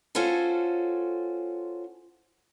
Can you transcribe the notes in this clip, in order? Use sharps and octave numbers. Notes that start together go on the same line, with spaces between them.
C#4 F4 F#4 A4 C5